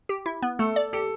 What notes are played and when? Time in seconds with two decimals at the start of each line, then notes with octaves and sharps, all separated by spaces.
0.09 G4
0.26 E4
0.42 B3
0.59 A3 A4
0.76 D5
0.93 G4 A4